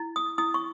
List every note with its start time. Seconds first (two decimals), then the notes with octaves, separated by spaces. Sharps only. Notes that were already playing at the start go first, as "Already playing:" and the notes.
Already playing: E4
0.16 D#6
0.38 E4 D#6
0.54 C#6